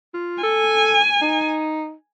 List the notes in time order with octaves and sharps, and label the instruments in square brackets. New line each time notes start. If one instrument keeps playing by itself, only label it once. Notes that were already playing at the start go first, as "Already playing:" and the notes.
[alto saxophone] F4
[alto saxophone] A4 [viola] G#5
[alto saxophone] D#4